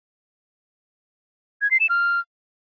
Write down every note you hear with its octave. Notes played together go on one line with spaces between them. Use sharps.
G#6
C7
E7
F6